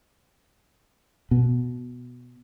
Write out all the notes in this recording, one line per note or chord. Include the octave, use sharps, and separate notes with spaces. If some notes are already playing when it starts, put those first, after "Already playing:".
B2